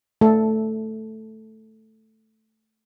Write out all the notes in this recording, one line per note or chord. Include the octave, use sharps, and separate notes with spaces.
A3 A4